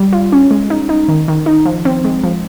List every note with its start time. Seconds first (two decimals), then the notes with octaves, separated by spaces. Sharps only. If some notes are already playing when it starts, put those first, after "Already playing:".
Already playing: G3
0.13 F4
0.32 C#4
0.51 G#3
0.70 D#4
0.89 D#4
1.08 D#3
1.28 D#3
1.46 D#4
1.65 F3
1.85 C4
2.05 G#3
2.24 F3